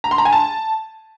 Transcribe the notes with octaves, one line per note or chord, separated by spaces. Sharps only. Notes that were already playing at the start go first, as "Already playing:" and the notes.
A#5
C6
A#5
G#5
A5